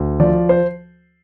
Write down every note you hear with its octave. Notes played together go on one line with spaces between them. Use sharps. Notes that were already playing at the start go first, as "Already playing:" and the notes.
Already playing: D2
F3 D5
C5